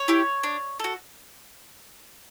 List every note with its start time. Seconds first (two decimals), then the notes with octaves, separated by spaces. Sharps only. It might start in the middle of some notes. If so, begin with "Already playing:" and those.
Already playing: C#5
0.08 E4 G4
0.43 D4
0.80 F#4 A4